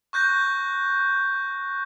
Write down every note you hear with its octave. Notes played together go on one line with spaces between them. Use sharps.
C#6 F#6 G6 A#6